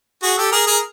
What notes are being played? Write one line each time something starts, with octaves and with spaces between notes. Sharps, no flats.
F#4 G#4
G4 A4
G#4 A#4
G#4 A#4